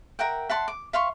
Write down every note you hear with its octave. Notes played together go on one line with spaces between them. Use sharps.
A#4 E5 F#5 G5
E5 F#5 A5 C6
D6
E5 F5 C6 C#6